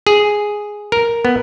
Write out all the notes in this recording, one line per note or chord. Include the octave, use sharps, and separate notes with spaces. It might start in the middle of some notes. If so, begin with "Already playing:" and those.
G#4
A#4
B3